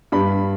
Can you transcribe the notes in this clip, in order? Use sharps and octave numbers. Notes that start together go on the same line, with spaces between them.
G2 B5